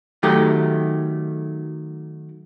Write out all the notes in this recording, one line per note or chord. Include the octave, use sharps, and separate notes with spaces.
D#3 F#3 A3 G4